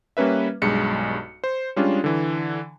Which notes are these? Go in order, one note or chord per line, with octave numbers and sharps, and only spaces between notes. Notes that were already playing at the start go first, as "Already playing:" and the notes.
G3 A#3 C#4 B4 E5
B1 G2 G#3 C#7
C5
G3 G#3 C#4 D4 F4
D3 E3